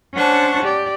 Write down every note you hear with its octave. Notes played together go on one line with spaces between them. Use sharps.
C#4 D4 C5 F#5 A5 C#6
G4 D5